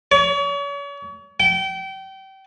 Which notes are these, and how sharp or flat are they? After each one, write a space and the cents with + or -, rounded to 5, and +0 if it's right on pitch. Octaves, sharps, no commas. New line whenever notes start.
C#5 +40
G5 -30